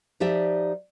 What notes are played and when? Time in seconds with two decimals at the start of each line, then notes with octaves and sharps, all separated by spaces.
0.20 F3 D#4 G4 D5 E5